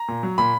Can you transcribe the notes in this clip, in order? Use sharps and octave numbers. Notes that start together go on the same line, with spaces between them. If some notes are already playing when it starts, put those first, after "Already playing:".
Already playing: A#5
A#2
F#3
A#2 B5